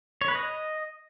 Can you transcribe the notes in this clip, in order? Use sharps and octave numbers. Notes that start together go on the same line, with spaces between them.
C#5
B4
D#5